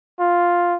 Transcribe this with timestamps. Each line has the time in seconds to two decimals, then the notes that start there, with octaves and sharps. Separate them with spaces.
0.20 F4